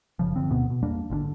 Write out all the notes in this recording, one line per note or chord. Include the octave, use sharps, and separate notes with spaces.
F#1 C#3 F3
G1 D3 F3 C4
D2 G#2 B2 B3
B2
E2 G3 A#3 D4
G#1 D3 C#4 D4